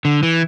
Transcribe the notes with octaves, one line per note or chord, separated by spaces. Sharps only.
D3
E3